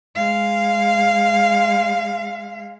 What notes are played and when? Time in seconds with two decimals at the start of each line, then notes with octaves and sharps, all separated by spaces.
0.15 G#3 F5